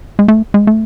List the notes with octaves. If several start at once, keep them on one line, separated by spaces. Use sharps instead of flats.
G#3
A3
G#3
A3